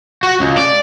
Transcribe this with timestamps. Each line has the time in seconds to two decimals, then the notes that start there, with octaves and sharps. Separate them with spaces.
0.23 F#4
0.40 C#2
0.58 D5